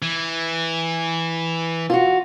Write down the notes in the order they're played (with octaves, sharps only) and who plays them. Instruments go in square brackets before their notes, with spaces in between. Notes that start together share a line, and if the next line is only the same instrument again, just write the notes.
[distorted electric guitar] E3
[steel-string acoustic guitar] F4 F#4